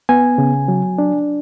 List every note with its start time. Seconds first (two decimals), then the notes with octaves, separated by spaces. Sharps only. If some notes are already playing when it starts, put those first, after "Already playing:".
0.09 B3 G#5
0.38 C#3
0.68 F#3
0.98 D4